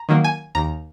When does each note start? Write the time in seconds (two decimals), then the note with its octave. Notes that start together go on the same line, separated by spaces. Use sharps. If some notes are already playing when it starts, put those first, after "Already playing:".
Already playing: A#5
0.09 D#3 F#3 A#3
0.24 G#5
0.55 D#2 A#5